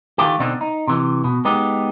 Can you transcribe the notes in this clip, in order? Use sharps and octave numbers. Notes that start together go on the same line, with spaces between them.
D3 D#3 A3 F4 G4
B2 D3 C4 D4 D#4
D#4
C3 E3
B2
G#3 B3 D#4 G4